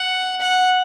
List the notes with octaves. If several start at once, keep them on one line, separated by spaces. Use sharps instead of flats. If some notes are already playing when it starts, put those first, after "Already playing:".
Already playing: F#5
F#5